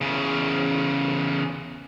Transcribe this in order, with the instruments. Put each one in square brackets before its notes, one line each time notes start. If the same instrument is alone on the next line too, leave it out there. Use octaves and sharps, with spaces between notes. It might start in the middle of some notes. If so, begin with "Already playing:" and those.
[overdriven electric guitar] E2 C#3